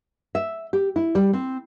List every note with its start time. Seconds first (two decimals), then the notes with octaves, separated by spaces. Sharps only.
0.35 E5
0.73 G4
0.96 E4
1.15 G3
1.33 C4